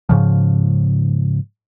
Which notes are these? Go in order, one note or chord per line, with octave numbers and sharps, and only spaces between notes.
G#2 C#3 F3